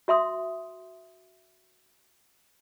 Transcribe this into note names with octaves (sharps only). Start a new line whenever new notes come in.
F#4 E5 C6 D#6